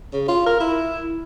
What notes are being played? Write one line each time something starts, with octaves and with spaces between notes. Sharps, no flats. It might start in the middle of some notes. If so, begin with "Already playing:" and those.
C#3
F4
A#4
E4